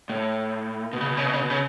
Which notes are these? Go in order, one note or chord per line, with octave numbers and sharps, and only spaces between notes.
A2
B2
C#3
B2
C#3
B2
C#3
B2
C#3